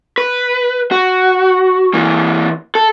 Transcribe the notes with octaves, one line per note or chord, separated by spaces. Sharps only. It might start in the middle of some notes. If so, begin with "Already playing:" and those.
B4
F#4
E3 A#3
A4